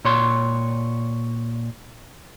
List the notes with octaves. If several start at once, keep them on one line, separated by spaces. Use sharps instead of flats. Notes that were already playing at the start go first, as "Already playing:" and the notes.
A#2 C#5 C6